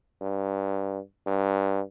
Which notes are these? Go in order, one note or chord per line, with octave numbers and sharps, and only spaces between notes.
G2
G2